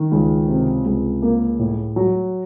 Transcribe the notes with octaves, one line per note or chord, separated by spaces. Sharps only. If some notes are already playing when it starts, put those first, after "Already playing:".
Already playing: D#3
C#2
C3
C#2
A#3
A2
F#3